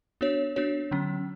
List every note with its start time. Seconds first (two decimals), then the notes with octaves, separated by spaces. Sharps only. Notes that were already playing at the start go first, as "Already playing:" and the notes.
0.21 B3 D4 F#4 C#5
0.56 B3 D4 F#4 C#5
0.91 D3 F#3 C#4